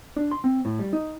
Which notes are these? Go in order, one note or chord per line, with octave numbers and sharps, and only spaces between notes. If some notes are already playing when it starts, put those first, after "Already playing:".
D4
C6
C4
A2
G3
D#4